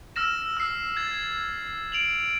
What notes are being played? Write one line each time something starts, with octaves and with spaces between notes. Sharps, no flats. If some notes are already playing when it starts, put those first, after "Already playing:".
E6 F6 A#6 E7
E6 C7
G#6 A6
D7 F7 F#7